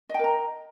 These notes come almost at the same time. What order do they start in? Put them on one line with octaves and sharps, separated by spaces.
D#5 G5 A#4 A#5